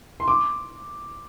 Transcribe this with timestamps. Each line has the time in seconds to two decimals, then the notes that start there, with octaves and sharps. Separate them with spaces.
0.20 C6
0.28 D6